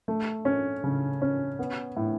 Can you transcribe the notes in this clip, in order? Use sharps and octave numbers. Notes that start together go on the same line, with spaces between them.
A3
C#4
C#3
C#4
B3
A2